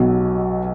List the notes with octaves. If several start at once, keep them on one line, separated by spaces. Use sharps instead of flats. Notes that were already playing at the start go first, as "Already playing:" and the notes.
Already playing: B1 B2 F#3